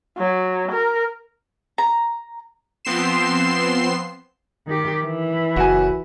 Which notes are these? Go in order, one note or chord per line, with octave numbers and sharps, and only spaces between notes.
F#3
A#4
A#5
F3 B3 C4 C6 C7 E7
D#3 G4
E3
F#1 F#4 G#5